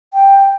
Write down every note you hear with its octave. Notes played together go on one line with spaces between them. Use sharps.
G5